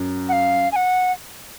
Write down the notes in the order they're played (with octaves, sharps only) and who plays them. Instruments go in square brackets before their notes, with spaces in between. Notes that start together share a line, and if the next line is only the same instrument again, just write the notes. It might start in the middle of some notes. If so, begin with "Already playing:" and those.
Already playing: [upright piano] F#2
[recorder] F#5
F5
G#5
F#5